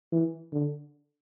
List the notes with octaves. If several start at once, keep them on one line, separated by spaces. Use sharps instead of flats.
E3
D3